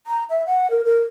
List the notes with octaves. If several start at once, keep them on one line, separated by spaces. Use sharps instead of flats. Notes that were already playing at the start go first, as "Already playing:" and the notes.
A#5
E5
F#5
A#4
A#4